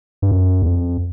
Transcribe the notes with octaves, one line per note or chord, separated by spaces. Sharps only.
G2
F#2
E2
F2